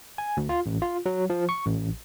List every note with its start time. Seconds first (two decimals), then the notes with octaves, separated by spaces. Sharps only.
0.18 G#5
0.37 D2
0.49 F4
0.66 A1
0.82 F4
1.06 F#3
1.30 F3
1.49 C#6
1.65 A1